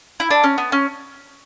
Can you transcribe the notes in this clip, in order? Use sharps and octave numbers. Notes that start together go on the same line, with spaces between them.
E4
D4
C#4
B3
C#4